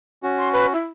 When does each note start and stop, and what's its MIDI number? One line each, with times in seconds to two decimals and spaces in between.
0.23 0.73 61
0.23 0.73 66
0.38 0.51 84
0.52 0.66 71
0.73 0.86 64